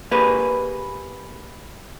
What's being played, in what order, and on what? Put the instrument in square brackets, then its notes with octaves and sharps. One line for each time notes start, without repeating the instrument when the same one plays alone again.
[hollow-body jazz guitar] A#3 G4 G#4 B4